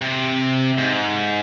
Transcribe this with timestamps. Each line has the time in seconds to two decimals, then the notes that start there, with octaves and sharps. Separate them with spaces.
0.02 C3
0.78 G#2